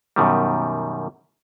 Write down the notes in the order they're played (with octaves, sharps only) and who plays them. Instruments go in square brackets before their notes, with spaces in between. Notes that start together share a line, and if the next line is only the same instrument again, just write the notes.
[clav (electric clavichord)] F#2 B2 D#3 G3